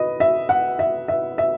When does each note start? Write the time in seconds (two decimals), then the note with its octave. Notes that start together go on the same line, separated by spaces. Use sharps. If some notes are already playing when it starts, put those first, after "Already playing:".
Already playing: B4 D#5
0.20 E5
0.49 F#5
0.79 E5
1.08 E5
1.38 E5